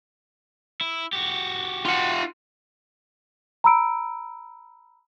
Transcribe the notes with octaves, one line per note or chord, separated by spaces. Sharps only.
E4
F#4 G4
F4 F#5
A#5 B5 E6 D7